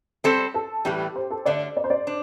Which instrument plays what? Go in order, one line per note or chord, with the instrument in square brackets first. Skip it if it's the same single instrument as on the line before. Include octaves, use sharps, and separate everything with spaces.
[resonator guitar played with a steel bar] G3 C4 A4 C5
[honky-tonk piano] A4
[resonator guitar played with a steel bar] A2 E3 G3 [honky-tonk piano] G4
[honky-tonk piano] C5
A4
[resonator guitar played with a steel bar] D3 A3 D4 [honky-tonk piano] D5
[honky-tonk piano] D5
C5
D5
[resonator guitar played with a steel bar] D4